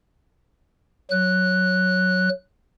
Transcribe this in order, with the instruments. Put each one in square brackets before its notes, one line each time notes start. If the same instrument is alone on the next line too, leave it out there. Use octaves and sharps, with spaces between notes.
[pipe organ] F#3 F#6